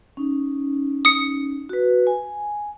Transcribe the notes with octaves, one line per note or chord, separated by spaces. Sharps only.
C#4 D#4
D#6 C#7
F#4 B4
G#5